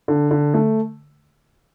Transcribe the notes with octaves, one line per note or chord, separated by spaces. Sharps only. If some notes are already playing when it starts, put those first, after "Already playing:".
D3
D3
A3